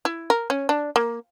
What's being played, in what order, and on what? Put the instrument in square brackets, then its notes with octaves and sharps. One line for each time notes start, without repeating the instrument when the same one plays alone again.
[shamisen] E4
A#4
C#4
D4
A#3